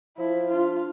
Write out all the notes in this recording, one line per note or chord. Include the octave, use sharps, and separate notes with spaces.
F3 E4
D4 F4